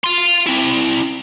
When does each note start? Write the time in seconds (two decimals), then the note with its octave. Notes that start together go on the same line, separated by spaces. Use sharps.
0.04 F5 C6
0.47 C4 E4